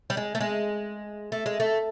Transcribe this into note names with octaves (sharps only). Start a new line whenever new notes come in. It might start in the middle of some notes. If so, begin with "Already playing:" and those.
G3
G#3
A3
G#3
A3
G#3
A3